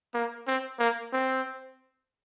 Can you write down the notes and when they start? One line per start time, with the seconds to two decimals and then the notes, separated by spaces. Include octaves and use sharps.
0.14 A#3
0.47 C4
0.79 A#3
1.13 C4